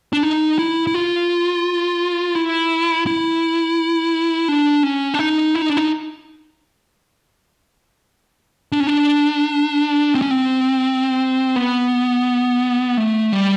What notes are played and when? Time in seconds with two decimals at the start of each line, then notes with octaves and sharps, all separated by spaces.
0.13 D4
0.23 D#4
0.59 E4
0.87 E4
0.95 F4
2.35 E4
3.07 E4
4.48 D4
4.83 C#4
5.14 D4
5.19 D#4
5.55 E4
5.62 D#4
5.69 D4
5.77 D#4
8.72 D4
8.80 C#4
8.87 D4
10.15 C4
10.22 C#4
10.31 C4
11.56 B3
12.97 A3
13.33 G3